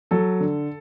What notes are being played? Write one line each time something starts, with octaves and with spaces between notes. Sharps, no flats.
F#3 A4
D3